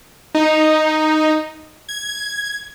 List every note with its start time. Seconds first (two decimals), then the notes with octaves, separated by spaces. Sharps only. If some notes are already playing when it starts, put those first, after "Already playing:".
0.35 D#4
1.89 G#6